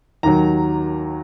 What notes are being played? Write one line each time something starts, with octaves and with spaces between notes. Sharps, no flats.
D#2 D#3 F#3 A#5